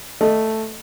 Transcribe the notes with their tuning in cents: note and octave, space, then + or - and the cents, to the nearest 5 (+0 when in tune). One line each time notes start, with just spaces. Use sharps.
A3 +0 D#5 -10